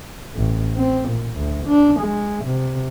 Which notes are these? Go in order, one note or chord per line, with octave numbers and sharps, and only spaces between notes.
A1
C4
A#2
D2
D4
G#3
C3